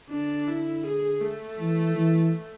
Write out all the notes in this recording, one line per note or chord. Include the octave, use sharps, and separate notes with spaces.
D3 D4
E4
G#4
A3
E3
E3